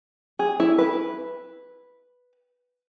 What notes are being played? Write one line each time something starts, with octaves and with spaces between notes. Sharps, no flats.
G#4
E4
B4